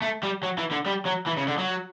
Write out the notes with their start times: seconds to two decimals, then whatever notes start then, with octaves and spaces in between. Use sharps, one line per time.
0.02 A3
0.23 G3
0.43 F#3
0.58 E3
0.71 D3
0.86 G3
1.05 F#3
1.26 E3
1.37 C#3
1.47 D3
1.58 F#3